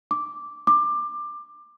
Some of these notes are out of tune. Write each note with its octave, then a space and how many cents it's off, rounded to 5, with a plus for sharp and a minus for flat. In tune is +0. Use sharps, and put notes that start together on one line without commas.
D6 -5
D6 +20